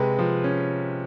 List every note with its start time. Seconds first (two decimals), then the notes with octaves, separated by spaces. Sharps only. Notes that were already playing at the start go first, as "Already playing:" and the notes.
Already playing: C3 G#3 B4
0.19 F3
0.44 C#4